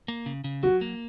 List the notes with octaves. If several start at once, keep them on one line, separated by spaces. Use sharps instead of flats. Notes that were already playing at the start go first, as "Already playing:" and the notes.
A#3
C#3
C#3
F#3 F#4
A#3